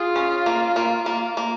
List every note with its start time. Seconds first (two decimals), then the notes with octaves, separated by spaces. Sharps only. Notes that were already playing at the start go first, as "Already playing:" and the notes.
Already playing: F4 G#4
0.16 C#4
0.46 A#3
0.76 A#3
1.06 A#3
1.37 A#3